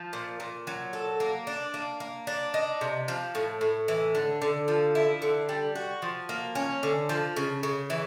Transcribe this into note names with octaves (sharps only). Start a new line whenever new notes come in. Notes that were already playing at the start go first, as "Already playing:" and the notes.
Already playing: F3
A#2
A#2
F#3
A4
A#3
D4
A#3
A#3
D4
D#4
C3
F3
A2
A2
E3
D3
D3
F3
E4
D3
G3
F#4
F3
A#3
C#4
D3
F3
C#3
C#3
E3